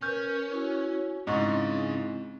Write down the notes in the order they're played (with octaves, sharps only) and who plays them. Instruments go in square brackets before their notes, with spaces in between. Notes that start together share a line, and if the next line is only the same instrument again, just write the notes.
[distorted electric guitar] C#4 [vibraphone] A#4 B4 [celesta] C#6 F6 G6
[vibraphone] E4 F#4 C#5
[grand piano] G#2 [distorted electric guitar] C#3 C#4 [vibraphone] C4 E4 [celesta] D#5 C#6